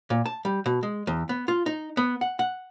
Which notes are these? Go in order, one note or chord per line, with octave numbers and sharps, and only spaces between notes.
A#2
A5
G3
B2
G#3
E2
B3
F4
D#4
B3
F#5
F#5